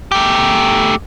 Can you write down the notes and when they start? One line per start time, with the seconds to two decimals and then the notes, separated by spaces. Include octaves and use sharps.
0.12 A3 G4